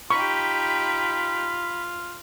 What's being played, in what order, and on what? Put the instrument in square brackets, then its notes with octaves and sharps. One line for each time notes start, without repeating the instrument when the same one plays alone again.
[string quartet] D#4 G4 [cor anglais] F4 [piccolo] B5 [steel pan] C#6